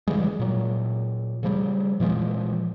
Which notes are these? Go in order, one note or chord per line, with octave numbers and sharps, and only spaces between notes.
C#3 E3 G3 G#3
A#2 F#3
C#3 F3 G3
A#2 E3 F3 G#3